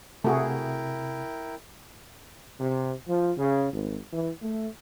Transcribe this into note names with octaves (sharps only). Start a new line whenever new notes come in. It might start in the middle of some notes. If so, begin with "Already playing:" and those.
C3 A3 E4 F#4 G#4 A#4 G5
C3
F3
C#3
G#1
E3
A3